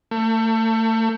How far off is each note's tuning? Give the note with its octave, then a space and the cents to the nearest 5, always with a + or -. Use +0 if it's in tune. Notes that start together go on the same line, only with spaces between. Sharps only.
A3 +30